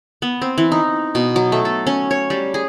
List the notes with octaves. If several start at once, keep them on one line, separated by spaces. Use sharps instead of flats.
B3
C4
E3
D#4
B2
F#3
A3
A4
C#4
C#5
G3
G#4